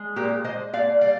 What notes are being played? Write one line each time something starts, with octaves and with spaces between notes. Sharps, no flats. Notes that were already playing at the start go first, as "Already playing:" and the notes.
Already playing: G#3
A#2 G4 A#4
G#3 C5 D#5
A#2 D5 F5
G3 D5 F5